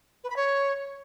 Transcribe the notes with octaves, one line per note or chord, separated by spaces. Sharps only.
B4
B5
C#5